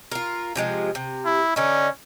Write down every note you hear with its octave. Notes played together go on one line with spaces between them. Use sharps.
F4 A#4
C3 F3 G#3
C3
E4
D3 C#4 D#4